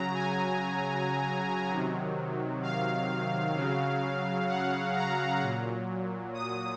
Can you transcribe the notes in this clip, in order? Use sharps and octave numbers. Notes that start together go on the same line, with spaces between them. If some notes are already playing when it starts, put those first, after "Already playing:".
Already playing: C#3 F#3 A#5
G#5
C3 D#3 F#3
F5
C#3 F#3
F#5
A#5
A#2 F#3
D#6